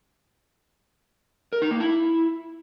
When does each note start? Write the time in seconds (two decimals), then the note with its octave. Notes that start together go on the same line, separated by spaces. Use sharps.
1.53 A#4
1.62 D#4
1.71 A#3
1.80 E4